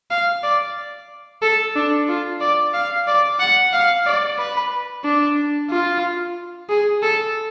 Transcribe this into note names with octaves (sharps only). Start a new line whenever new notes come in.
F5
D5
A4
D4
F4
D5
F5
D5
F#5
F5
D5
B4
D4
F4
G#4
A4